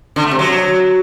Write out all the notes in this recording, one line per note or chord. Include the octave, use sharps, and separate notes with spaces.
D3
A3
C3
F#3